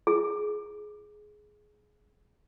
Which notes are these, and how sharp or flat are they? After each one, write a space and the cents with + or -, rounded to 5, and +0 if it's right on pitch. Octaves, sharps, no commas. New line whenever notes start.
G#4 +15